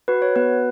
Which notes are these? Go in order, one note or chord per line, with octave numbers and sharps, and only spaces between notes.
F#4 B4
C#5
B3 B4